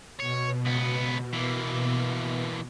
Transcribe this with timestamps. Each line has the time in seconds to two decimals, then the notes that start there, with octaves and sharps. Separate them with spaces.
0.20 B2 C#5
0.65 C#2 B3
1.33 E3 A#3